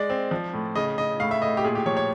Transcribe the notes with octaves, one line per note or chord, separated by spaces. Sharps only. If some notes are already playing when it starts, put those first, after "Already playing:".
Already playing: G#3 D5
C4
F3
A2
C#3 D#5
C#3 D#5
A2 F5
E5
A2 D#5
G4
A#2 G#4
G4
F3 C#5
C#5